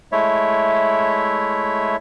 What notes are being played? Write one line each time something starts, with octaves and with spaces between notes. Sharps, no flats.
G#3 A3 E4 C#5 E5